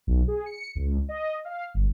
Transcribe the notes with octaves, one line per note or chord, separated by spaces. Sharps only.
B1
G#4
C#7
C#2
D#5
F5
G1